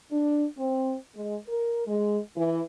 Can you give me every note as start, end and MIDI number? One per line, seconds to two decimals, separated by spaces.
0.11 0.45 62
0.57 0.94 60
1.15 1.36 56
1.48 1.82 70
1.86 2.18 56
2.36 2.60 52